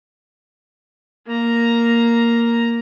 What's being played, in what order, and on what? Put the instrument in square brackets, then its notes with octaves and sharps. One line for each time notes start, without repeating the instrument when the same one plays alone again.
[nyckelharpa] A#3 A#5